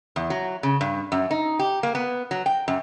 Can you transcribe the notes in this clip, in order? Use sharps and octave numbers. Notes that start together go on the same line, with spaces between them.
E2
F#3
C#3
G2
F#2
D#4
G4
A#3
B3
F#3
G5
F#2